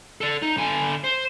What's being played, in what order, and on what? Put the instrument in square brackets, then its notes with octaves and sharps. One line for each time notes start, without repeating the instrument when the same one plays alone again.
[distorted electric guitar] A4 D5
D#4
D3 G#5
C5